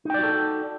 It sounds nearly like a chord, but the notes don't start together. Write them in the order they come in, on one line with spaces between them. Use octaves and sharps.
D#4 G5 D5 F#4 A4